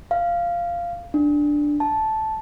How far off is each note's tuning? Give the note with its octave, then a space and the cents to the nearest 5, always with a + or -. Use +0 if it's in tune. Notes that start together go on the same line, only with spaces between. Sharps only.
F5 -10
D4 +0
A5 -10